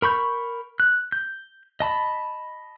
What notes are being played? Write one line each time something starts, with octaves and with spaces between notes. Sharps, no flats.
A#4 B5 C#6 G6
F#6
G6
D#5 A5 B5